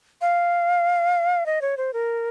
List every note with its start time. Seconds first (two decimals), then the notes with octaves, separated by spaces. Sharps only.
0.21 F5
1.46 D#5
1.62 C#5
1.77 C5
1.93 A#4